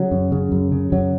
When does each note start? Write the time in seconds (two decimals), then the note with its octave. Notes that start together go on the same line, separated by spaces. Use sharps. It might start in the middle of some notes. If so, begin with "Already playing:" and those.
Already playing: C#3 F#3
0.11 F#2
0.32 C#3
0.52 F#2
0.72 C#3
0.92 F#2 F#3